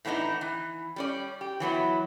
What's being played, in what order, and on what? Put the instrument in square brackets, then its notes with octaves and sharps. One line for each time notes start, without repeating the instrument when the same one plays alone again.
[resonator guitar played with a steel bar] A2 E3 B3 D4 D#4
E3
G3 C#4 D5
G4
E3 F#3 B3 E4